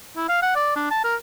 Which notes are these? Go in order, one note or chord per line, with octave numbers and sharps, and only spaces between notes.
E4
F5
F#5
D5
D4
A5
A#4